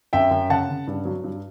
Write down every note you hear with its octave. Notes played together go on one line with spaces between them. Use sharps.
F#2 E5 G5
F#2
C#3 F#5 A5
C#3
G2
F#3
G2